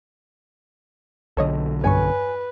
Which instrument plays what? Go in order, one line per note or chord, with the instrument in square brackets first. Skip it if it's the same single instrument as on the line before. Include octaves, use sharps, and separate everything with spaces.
[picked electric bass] B1 D3 [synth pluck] A4 C#5 D#5
[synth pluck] E2 G2 C#6 [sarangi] B4 [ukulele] C#5 G#5